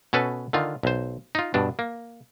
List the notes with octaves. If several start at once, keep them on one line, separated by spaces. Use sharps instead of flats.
B2 C#4 A4 B4
D3 D#3 F4
B1 C5
D#4 F4
G2 B2 D4
A#3